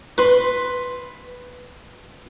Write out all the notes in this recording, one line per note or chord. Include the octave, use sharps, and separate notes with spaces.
B4 C6